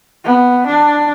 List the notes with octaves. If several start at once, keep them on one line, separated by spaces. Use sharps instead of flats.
B3
D4